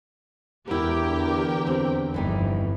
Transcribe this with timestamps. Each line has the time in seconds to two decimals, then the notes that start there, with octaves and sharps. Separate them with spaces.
0.68 E2 D3 B3 E4 G4 A#4 G5
1.67 C4
2.14 G1 F2 E3 G3 D#4